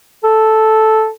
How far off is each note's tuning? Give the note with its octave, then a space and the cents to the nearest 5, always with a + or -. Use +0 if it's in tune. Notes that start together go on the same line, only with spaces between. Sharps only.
A4 -5